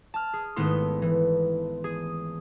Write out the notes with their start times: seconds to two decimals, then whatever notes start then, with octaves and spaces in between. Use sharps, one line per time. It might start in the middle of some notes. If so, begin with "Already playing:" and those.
0.14 A5 F6
0.33 G#4
0.56 G#1 A3 B3 E4 A4 C6
1.02 E3
1.84 G#4